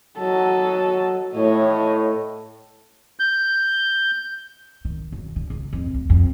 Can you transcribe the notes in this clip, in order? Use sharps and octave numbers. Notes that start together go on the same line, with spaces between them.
F#3 A4 D#5
A2 C#5 D#5
G6
D#3
F#2
D3
C#2
F2
D2
F2